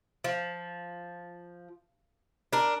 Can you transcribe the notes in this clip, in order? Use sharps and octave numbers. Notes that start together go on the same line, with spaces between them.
F3
D4 A#4